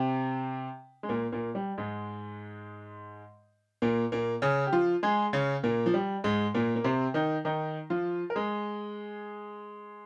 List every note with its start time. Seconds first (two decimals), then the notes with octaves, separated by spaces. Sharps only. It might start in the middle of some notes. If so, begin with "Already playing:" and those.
Already playing: C3 C4
1.03 G#3
1.09 A#2 A#3
1.32 A#2 A#3
1.55 G3
1.78 G#2 G#3
3.82 A#2 A#3
4.12 A#2 A#3
4.42 C#3 C#4
4.67 G4
4.73 F3 F4
5.03 G#3 G#4
5.33 C#3 C#4
5.63 A#2 A#3
5.86 F3
5.94 G3
6.24 G#2 G#3
6.54 A#2 A#3
6.76 A#3
6.84 C3 C4
7.14 D#3 D#4
7.45 D#3 D#4
7.90 F3 F4
8.30 A#4
8.36 G#3 G#4